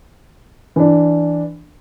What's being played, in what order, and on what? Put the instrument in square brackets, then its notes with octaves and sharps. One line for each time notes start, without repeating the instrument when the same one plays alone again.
[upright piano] E3 D4